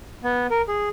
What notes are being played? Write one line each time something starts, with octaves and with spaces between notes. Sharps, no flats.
B3
A#4
G#4